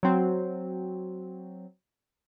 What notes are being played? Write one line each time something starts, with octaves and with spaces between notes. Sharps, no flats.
F#3 C4